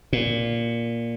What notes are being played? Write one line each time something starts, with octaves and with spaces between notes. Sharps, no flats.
A#2